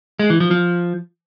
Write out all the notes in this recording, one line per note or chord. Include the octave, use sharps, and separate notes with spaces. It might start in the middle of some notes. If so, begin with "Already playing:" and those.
G#3
E3
F3
F3